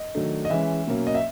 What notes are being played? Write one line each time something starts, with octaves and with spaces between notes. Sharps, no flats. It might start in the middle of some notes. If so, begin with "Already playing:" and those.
Already playing: D#5
D#3 F#3 A3 D4
D#5
E3 G#3 C#4 E5
B2 F#3 A#3 C#4
D#5
E5